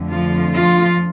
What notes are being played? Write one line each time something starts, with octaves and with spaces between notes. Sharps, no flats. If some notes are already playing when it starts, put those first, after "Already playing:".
Already playing: F2 D3 A3
F3 F4
F3 F4